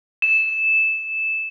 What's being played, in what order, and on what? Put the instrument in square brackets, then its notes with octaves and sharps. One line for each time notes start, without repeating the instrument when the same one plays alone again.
[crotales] E7